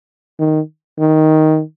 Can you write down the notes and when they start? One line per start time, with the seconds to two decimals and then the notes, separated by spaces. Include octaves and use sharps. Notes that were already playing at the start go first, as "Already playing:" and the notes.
0.39 D#3
0.99 D#3